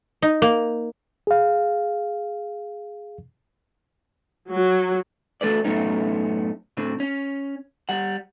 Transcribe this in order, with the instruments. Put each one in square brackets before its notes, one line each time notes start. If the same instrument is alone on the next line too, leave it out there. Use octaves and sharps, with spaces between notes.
[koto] D#4
A#3
[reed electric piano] G#4 F5
[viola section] F#3
[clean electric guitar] D3 A3 A4 B4 D5
F#2 A2 A3 B3 C#4 D#4
A2 D3 C4
C#4
G3 F#5